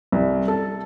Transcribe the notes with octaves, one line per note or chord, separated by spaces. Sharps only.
C2
A4